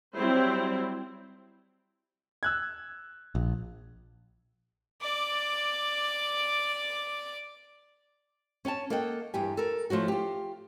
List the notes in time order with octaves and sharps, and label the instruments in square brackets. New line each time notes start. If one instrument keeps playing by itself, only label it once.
[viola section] F#3 G3 C4 E4 C5
[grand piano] E6 F#6 G#6
[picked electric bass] A#1
[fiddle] D5 D6
[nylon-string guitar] C#4 C#5 G5 A5
A#3 A4 D#5 F#5 G5
E2 G2 G4 G#5
A4 A#4
F3 A3 C#4 F#4
F4 G4